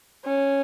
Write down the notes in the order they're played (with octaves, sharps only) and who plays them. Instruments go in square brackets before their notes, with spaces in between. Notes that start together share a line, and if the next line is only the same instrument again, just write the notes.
[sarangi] C#4